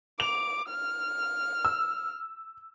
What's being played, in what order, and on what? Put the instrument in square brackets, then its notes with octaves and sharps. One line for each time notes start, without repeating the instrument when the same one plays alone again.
[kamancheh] D6 [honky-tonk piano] F7
[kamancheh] F6
[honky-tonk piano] E6